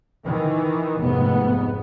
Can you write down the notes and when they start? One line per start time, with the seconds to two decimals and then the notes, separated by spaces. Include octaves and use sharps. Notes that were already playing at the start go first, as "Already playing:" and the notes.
0.24 D#3 E3
1.00 F1 G#2 B3